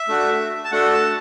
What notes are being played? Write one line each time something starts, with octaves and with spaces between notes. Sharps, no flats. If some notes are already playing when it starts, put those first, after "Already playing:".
Already playing: E5
A3 D4 F#4
A5
A3 D4 F#4 A4 F#5
A5